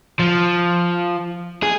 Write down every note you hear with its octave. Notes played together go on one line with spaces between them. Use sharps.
F3
G#4